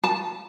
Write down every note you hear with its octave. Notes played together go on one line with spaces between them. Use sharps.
A5